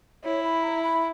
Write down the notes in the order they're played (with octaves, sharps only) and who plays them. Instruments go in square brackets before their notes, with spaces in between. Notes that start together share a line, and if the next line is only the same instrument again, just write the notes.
[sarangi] E4 [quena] C#5
[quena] B5
A#5
B5